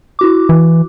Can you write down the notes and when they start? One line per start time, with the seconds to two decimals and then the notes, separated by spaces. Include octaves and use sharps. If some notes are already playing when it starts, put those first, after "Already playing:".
0.19 E4 F#4 D6
0.49 E3